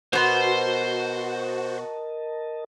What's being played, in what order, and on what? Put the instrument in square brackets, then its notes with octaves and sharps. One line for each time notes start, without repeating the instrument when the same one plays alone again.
[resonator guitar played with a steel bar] B2 B3 [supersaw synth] F#4 [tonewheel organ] A#4 D#5 A5 [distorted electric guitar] C5 C6